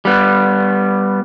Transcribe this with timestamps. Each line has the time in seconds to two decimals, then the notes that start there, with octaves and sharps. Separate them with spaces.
0.05 G3 B3